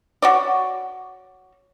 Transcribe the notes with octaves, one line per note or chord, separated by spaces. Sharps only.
F#4 C#5 D5